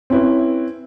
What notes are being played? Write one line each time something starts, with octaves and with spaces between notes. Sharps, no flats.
C4 C#4 E4 B4